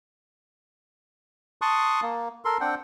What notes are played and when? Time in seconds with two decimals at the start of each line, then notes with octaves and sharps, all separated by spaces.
1.62 A5 C6 C#6 D#6 F#6
2.02 A#3
2.45 A4 A#4 C6
2.61 C4 D4 F#5 G5